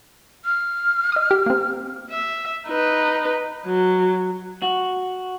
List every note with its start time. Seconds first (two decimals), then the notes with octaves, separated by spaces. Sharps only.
0.45 F6
1.12 D#5 D#6
1.31 G4
1.46 A#3 C4
2.10 E5
2.68 D#4 B4
3.66 F#3
4.62 F#4